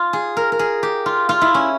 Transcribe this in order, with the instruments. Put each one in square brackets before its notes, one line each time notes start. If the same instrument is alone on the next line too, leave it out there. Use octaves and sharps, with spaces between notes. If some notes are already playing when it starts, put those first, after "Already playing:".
Already playing: [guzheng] F4
G#4
A#4
A#4
G#4
G4
F4
F4
E4
C#4